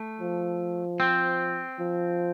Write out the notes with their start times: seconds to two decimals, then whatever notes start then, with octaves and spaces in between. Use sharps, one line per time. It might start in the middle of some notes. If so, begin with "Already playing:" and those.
Already playing: A3
0.20 F3
1.00 C4
1.79 F3